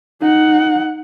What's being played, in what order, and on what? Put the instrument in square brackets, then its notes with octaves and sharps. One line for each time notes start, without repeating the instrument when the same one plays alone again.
[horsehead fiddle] D#4 F#5